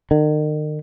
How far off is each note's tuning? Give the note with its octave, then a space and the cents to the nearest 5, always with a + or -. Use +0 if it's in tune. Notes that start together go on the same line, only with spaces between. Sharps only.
D#3 -40